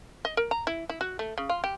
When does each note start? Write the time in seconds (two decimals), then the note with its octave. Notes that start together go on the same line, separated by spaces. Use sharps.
0.25 D#5
0.37 A#4
0.51 A#5
0.67 E4
0.89 E4
1.01 F#4
1.19 A3
1.38 C#3
1.49 F4
1.64 G4